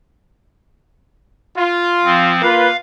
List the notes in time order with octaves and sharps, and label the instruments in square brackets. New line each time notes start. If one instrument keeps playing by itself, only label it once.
[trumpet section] F4
[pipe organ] F3 C4
[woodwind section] A#3 F4 B4 [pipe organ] F5